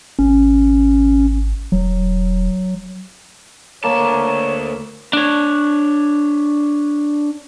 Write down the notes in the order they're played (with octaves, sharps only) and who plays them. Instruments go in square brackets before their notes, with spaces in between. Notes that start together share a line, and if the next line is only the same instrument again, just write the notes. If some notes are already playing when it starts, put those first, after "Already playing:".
[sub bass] G#1 [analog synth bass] C#4
[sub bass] E1 [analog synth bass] F#3
[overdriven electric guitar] D2 A5 [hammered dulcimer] A#3 [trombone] C#5
[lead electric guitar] D4 C#5